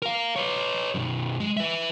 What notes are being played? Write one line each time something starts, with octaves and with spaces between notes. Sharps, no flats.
A#4 F5
B4 C#5
B1 F#2
G#3
B4 E5